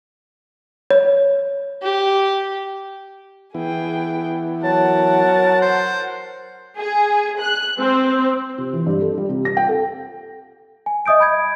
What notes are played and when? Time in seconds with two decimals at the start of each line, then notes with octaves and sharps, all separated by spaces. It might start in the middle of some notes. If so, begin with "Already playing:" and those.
0.91 C#5
1.82 G4
3.54 E3 B3 E4 G#4 G5
4.64 F#3 A#4 F#5 A5
5.62 C5
6.78 G#4
7.41 F#6
7.80 C4
8.58 C3
8.73 E3
8.87 G2
9.02 A4
9.18 G3
9.29 C3
9.45 A#6
9.57 G5
9.69 A4
10.86 G#5
11.06 D#5 E5 D#6 G6 D7
11.20 B5 G6 G#6 D7